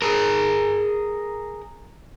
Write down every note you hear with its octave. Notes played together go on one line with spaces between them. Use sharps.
G#4 A#4